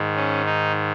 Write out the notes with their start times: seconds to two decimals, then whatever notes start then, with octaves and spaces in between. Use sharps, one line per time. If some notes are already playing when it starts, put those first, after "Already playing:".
Already playing: G#2 D#3
0.16 C#4
0.46 D#4